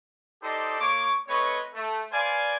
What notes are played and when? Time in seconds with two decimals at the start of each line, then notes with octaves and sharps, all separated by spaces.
0.42 D#4 G4 A4 C5 D5 D#5
0.81 A#3 C#5 C#6 D6
1.28 A3 C4 B4 C#5 D#5 C#6
1.74 A3
2.11 B4 C5 D5 F5 G#5